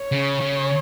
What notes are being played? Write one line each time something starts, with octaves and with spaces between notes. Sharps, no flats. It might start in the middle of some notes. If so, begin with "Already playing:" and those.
Already playing: C#5
C#3
C#3